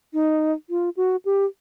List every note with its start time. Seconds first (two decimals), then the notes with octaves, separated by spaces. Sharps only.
0.13 D#4
0.70 F4
0.97 F#4
1.25 G4